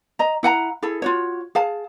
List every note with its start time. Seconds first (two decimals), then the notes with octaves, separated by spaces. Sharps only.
0.19 D#5 A#5
0.43 E4 F#5 G#5 A#5
0.82 E4 G#4 A4
1.02 F4 F#4 C#5
1.55 G#4 F5 A5